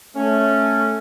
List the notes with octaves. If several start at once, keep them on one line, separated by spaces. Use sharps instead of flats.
A3 C#4